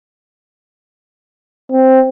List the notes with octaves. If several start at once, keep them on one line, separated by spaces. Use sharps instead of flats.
C4